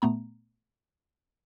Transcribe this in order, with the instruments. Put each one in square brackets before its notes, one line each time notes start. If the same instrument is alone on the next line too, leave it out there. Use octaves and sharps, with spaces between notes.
[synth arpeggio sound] A#2 A3 B3 A#5